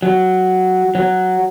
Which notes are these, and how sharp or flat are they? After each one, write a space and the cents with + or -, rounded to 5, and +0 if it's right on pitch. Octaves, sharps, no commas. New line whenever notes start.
F#3 +5
F#3 +0